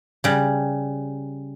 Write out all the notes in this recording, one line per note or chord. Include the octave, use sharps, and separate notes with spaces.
C#3 G3